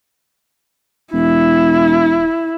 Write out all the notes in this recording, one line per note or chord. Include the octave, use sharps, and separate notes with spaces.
E1 E4